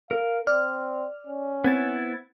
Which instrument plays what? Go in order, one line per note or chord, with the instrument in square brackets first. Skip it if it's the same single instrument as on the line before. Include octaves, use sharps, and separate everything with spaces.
[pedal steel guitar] A#4 [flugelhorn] F5
[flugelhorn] C4 [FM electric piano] D5 [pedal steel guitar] F6
[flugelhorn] C#4
[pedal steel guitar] B3 E4 [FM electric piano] C4 G#6 A6